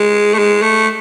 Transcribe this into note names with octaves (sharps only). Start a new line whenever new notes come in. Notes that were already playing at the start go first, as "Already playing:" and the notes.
Already playing: G#3
A3
G#3
A3